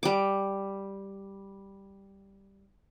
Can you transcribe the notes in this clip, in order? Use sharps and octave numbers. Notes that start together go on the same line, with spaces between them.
G3 D6